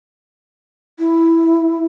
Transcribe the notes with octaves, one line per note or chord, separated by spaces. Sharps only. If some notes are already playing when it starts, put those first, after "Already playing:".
E4